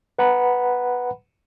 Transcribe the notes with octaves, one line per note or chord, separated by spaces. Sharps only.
B4 F#5 A#5 B5